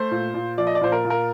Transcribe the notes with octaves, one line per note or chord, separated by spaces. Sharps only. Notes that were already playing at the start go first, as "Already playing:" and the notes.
Already playing: A3 C5
A#2
A#2
F3 D5
D#5
D5
A#2 C5
A#4
A#2
A#4